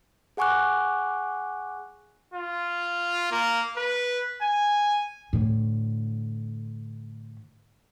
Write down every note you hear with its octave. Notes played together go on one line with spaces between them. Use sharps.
G#4 F#5 G#5 C#6 D6 F#6
F4
A#3
B4
G#5
A2 D3